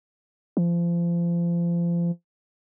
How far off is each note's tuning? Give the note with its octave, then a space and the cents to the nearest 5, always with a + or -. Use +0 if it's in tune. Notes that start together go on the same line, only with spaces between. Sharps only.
F3 -30